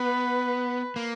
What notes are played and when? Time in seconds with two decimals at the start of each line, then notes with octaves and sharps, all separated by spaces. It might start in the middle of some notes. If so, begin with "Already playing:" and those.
Already playing: B3 B4
0.96 A#3